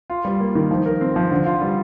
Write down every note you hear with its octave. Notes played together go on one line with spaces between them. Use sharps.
F4
G3
A#3
D#3
F3
A#4
C4
F3
D3
F4
G3